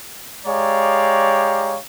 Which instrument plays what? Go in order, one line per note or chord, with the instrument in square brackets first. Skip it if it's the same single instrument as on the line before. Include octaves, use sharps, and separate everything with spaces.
[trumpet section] G#3 G4 C#5 D5 F5 A#5